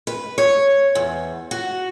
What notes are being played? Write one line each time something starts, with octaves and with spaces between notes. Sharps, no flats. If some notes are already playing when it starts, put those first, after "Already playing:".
B4
C#5
E2
F#4